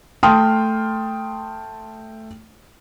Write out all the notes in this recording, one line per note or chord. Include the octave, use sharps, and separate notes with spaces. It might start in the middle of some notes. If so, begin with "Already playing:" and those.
A3 G5 A5 C6 D#6 F6